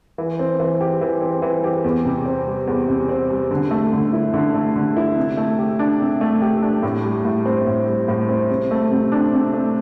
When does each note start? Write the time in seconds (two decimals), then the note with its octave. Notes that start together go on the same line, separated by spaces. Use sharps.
0.18 E3
0.39 C4
0.60 E3
0.81 G4
1.01 E3
1.22 C4
1.42 E3
1.64 G4
1.84 E2
2.05 C3
2.26 C4
2.46 G3
2.67 E2
2.88 C3
3.09 C4
3.30 G3
3.51 D3
3.71 A3
3.93 D3
4.13 E4
4.34 D3
4.55 A3
4.76 D3
4.97 E4
5.17 C3
5.37 A3
5.58 G4
5.79 D4
6.00 C3
6.21 A3
6.42 G4
6.62 D4
6.83 A2
7.04 G3
7.25 A2
7.46 C4
7.67 A2
7.88 G3
8.08 A2
8.29 C4
8.50 C3
8.71 A3
8.91 C3
9.12 D4
9.33 C3
9.53 A3